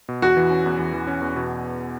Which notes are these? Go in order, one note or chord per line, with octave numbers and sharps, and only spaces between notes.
B2
E2 F#4
E3
C#4
E2
E2
E3
C#4
E2
B2